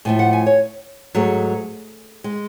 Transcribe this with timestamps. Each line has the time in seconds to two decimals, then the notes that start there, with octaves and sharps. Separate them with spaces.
0.05 A2 F3 A3 G#5
0.19 F#5
0.33 G#5
0.46 C#5
1.15 G#2 F#3 A3 G#4
2.24 G#3